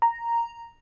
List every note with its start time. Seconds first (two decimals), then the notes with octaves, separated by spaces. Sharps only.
0.02 A#5